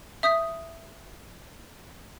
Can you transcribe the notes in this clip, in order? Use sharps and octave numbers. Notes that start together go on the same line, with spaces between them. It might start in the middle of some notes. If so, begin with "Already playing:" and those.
E5 D#6 G6 B6